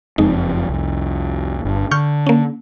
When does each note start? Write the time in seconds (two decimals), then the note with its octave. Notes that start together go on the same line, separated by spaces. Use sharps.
0.18 F#1 F2 G#3 C4 D#4
0.69 C2 F2
1.65 G1 G2
1.91 D3 C#6 F6 G6
2.27 A#3 C#4